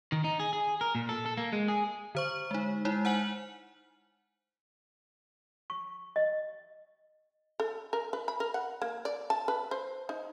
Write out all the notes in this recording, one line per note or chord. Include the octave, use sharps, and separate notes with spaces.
D#3
D#4
G#4
G#4
A#4
A#2
A4
A4
A#3
G#3
G#4
D3 C5 C#6
G#3 D#4
G#3 D#4 E4
C5 F#5 G#5 F#7
C#6
D#5
A4
A#4
B4
B5
A#4
F#5
A#3
D5
A5
B4
C5
D#4